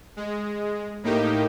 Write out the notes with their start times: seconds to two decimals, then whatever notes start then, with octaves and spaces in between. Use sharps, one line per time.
0.17 G#3
1.03 A2 A#3 D#4 G4